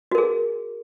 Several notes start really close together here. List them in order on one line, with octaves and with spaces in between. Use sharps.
F#4 A#4 G#4